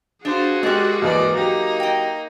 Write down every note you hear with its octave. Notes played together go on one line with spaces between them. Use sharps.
D4 F4 F#4 G#4 C5
G#3 G4 A4 A#4 D5 F#6
D#2 G#2 E3 D5 D#5
F#3 A#3 D#4 G4
D#5 G5